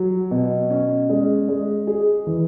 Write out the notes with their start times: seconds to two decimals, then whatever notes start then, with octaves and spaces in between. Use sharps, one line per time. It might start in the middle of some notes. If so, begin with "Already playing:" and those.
Already playing: F#3
0.31 B2
0.70 C#4
1.09 G#3
1.49 G#3
1.87 G#4
2.27 E3